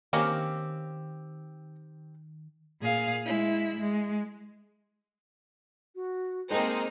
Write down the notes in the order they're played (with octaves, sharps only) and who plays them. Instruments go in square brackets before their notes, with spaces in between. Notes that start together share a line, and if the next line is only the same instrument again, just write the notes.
[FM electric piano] D#3 [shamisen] A#3 C#4 D#4 [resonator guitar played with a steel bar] C4 G4
[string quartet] A#2 G#4 F5
G#3 E4
G#3
[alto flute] F#4
[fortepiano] G#3 A#3 [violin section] C4 D#4 [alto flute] A5